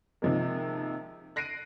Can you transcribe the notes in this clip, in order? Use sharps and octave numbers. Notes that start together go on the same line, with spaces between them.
C3 D#3 F3 G#3 A#3
F#6 A#6 C7 D7 D#7